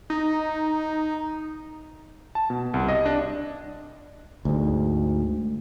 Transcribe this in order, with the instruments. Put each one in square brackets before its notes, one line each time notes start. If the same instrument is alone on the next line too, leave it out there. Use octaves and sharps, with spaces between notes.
[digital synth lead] D#4
[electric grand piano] A5
B2
C2
D#5
D4
[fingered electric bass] D2 G#2